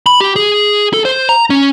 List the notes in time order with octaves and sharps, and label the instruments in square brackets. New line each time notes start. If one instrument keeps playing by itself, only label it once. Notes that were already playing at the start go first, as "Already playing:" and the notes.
[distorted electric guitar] B5
G4
G#4
A4
C5
A#5
C#4